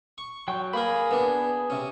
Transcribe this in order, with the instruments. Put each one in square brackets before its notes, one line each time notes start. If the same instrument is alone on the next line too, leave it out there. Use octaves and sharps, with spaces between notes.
[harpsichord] C#6
[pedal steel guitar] F#3 G5
[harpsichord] A#3 A#4 [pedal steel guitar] G#4 B5
[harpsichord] B3 D4
C3 C#4